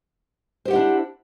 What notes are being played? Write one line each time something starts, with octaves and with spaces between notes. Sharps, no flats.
D4 E4 G4 C5 F#5